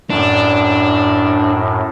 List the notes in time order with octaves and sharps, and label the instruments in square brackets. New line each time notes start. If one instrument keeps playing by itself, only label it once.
[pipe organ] F#2 A2 [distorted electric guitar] D4